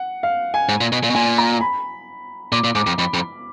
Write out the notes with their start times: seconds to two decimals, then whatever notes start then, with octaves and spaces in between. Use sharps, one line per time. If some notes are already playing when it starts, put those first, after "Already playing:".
Already playing: F#5
0.23 F5
0.54 G#5
0.69 G#2
0.81 A#2
0.92 B2
1.04 A#2
1.10 B2
1.15 A#2 G#5
1.38 A#5
1.61 B5
2.52 A#2 D6
2.64 A#2
2.75 G#2 D6
2.87 F2
2.98 F2 B5
3.14 F2